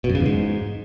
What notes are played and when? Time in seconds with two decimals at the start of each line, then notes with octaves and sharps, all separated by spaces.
0.04 B2
0.09 F#2
0.15 C#3
0.20 E2
0.26 G#2